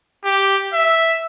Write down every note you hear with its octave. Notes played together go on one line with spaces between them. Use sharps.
G4
E5